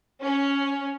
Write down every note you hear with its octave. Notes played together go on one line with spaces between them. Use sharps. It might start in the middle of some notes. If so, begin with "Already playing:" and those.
C#4